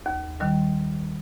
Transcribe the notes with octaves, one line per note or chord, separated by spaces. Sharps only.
D#2
D#3 G3